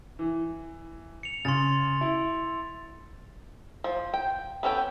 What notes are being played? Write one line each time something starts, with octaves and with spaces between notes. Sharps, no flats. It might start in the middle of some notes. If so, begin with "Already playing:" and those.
E3
C#7 F7
C#3 C6 A6
E4
F3
G5
B3 C#4 A4 D5 G5